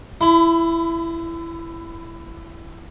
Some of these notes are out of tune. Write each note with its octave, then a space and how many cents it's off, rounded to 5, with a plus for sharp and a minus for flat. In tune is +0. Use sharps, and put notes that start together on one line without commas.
E4 +15 B5 +40